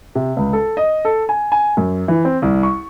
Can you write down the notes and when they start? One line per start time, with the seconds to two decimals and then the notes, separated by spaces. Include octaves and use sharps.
0.15 C3
0.37 C#2
0.53 A4
0.77 D#5
1.05 A4
1.29 G#5
1.52 G#5
1.77 F#2
2.08 E3
2.25 C4
2.42 C2
2.63 C#6